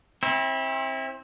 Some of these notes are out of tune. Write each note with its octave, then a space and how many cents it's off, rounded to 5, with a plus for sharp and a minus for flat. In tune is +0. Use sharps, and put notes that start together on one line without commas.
C4 +30 E4 -20